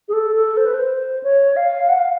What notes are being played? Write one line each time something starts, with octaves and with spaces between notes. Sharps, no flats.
G#4
A4
A4
C5
B4
C5
C#5
F5
F#5
F5